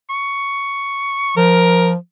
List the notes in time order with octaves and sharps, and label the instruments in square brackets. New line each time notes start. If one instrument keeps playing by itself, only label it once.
[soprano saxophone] C#6
[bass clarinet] F3 [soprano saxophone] A#4